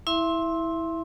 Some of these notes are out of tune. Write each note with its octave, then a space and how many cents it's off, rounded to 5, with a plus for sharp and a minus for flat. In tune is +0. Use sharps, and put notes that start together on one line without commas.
E4 -15 E5 +25 C6 +15